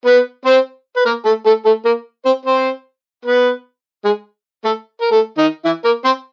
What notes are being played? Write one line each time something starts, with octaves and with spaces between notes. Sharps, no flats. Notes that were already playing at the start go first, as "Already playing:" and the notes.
B3 B4
C4 C5
B4
A#3 A#4
A3 A4
A3 A4
A3 A4
A#3 A#4
C4 C5
C4 C5
B3 B4
G#3 G#4
A3 A4
A#4
A3 A4
D#3 D#4
E3 E4
A#3 A#4
C4 C5